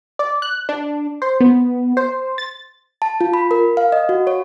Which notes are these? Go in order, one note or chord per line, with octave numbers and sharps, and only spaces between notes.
D5
F#6
D4
C5
B3
C5
A6
A5
F4
B5
A#4
F5
D#5
F#4
C#5